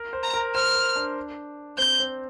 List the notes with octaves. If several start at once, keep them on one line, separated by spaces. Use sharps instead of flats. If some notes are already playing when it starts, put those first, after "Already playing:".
Already playing: A#4
C5
A#5
A#4
C5 F6
A#4
D4
C4 G6
C4